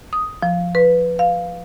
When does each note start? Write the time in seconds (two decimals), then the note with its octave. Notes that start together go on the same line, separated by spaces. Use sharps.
0.13 D#6
0.43 F3
0.75 B4
1.19 F5